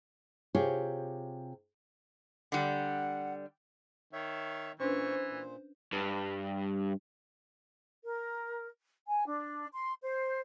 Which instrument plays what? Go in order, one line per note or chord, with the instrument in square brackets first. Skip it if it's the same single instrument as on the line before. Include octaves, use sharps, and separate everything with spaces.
[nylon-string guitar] C3 F4 G4 G#4 C#5
[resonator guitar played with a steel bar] D3 G3 [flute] F#5
[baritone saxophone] D#3 [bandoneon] C#5 E5
[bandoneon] A#2 C#6 [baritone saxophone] E3 [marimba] C#4 D4 B4 [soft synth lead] C5
[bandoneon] A#2
[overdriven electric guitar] G2
[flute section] A#4
G#5
D4
C6
C5